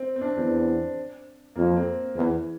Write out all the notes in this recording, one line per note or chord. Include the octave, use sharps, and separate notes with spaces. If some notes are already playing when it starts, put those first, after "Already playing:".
Already playing: C4
C4
D4
E2 C4
F2 A#3
C4
E2 E3